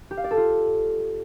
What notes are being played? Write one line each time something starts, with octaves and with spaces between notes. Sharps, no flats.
G4
F5
D5
A4
F4